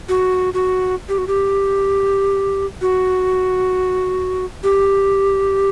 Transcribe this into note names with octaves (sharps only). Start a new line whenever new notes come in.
F#4
F#4
G4
F#4
G4
F#4
G4